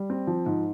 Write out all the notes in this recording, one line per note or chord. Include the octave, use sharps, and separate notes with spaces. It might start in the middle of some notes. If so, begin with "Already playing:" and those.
Already playing: G3
C4
F3
G#2